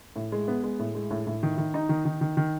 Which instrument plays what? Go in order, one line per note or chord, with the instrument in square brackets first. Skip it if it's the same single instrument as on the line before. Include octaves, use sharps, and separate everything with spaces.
[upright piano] A2
G#3
B3
G#3
A2
G#3
A2
A2
D#3
D#3
D#4
D#3
D#3
D#3
D#3